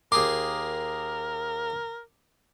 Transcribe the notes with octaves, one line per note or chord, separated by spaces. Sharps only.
D#2 G#4 A#4 C6 D6